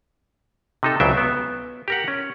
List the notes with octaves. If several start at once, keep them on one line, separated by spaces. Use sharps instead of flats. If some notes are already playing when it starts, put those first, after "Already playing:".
C3 D#4 A4
C#2 C#3 F#3 C5 E5 G5
B3
G4 A#4 F#5
C#4